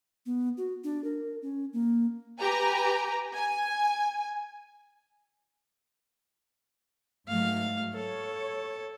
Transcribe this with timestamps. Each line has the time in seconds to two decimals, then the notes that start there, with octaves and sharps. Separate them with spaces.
0.26 B3
0.58 F#4
0.84 D4
1.04 A#4
1.42 C#4
1.73 A#3
2.41 G4 B4 G#5 A#5
3.34 G#5
7.28 G#2 F#3 A3 F5
7.93 A4 C#5